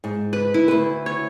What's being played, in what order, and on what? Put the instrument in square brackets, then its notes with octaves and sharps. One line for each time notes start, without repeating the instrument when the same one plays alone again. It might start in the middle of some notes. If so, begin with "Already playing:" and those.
[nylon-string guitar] G#2
[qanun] B4
E4
[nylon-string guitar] D2 B4
[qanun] C#5